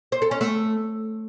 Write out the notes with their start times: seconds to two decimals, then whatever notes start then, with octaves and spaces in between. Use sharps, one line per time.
0.12 C5
0.22 A4
0.31 C#4
0.41 A3